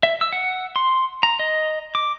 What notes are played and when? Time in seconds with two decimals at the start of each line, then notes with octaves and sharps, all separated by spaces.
0.03 E5
0.21 E6
0.33 F#5
0.76 C6
1.23 A#5
1.39 D#5
1.95 D6